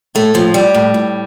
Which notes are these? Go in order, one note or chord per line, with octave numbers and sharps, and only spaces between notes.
A2 A3
A2 F3
A2 G3
A2
A2